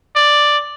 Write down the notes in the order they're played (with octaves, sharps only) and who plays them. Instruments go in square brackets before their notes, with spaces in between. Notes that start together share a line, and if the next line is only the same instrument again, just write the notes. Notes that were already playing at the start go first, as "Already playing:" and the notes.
[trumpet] D5